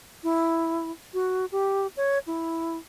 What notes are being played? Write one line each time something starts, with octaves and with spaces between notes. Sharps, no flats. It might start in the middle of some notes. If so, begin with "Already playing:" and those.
E4
F#4
G4
C#5
E4